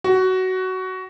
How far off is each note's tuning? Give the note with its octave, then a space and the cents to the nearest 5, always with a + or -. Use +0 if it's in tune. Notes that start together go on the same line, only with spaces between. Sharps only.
F#4 +15